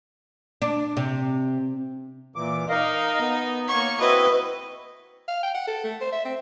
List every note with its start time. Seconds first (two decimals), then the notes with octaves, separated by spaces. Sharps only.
0.62 D4
0.97 C3
2.36 A#2 E3 D6
2.69 D#4 A#4 D#5 F5
3.20 B3
3.68 A#3 C#5 C#6
4.00 C4 E4 F#4 B4 D#5
5.28 F5
5.43 G5
5.55 F#5
5.68 A4
5.84 A3
6.01 C5
6.13 E5
6.25 C4